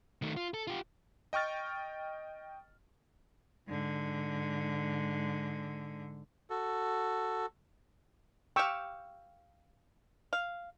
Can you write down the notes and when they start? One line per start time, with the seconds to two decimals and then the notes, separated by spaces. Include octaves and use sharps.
0.22 D#3 A3
0.37 F4
0.54 A4
0.67 F4 G4
1.33 D#5 G5 C#6 F6 A6
3.68 G#2 D3
6.50 F#4 A4
8.56 G4 F5 G5 C#6 E6
10.33 F5